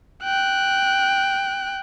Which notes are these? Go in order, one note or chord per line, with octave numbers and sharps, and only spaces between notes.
G5 F#6